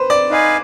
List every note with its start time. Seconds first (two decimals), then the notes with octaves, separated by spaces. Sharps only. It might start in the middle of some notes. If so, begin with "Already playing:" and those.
Already playing: B4 C5
0.10 D5
0.30 D#4 B4 F5 G#5